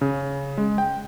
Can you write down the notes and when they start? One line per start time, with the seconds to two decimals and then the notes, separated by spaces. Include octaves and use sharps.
0.01 C#3
0.58 G#3
0.78 G5